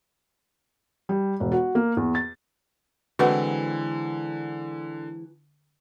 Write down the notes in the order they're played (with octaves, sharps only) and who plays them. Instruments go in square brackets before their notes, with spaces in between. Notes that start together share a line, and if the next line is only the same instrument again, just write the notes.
[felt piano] G3
E1
F#4
A#3
E2
A6
[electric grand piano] D3 [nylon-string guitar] E3 G#3 C4 [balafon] F#4 B4 F#5